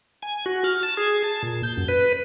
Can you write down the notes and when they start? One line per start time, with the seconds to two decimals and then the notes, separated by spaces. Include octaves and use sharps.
0.23 G#5
0.46 F#4
0.64 F6
0.83 A5
0.97 G#4
1.24 A5
1.43 A#2
1.63 G6
1.77 F#2
1.88 B4